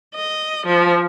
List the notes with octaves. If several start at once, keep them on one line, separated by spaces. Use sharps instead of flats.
D#5
F3